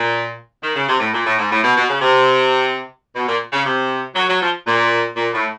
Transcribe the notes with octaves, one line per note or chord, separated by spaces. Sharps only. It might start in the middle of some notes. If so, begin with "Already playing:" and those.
Already playing: A#2
D#3
C#3
C3
A2
A#2
A2
G#2
A2
B2
B2
C#3
C3
B2
A#2
C#3
C3
F#3
F#3
F3
A#2
A#2
A2